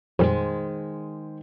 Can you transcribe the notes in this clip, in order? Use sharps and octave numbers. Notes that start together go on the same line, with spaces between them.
F2 A#2 D#3 G3 G#3 C5